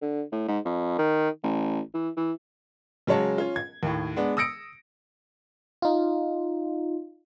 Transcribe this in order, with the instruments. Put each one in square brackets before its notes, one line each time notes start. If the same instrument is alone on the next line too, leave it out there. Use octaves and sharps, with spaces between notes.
[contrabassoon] D3
A2
G#2
F2
D#3
A1
E3
E3
[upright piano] C#3 F#3 G#3 C#5 A5
C#4 F4
G#6
D#2 A2
G#3 B3 D4
D#6 E6 A#6 C#7 D7
[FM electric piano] D#4 F4